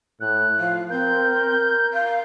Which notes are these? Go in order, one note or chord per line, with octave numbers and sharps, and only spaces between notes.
A2 F#6
F3 F5
C4 A#4 G6
F5